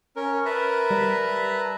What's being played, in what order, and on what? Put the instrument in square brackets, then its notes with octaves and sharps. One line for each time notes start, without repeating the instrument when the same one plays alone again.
[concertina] C#4 [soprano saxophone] A#4
[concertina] B4 [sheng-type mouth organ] E5 A5 A#5
[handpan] G3